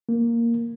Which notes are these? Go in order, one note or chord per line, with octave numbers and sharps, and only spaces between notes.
A#3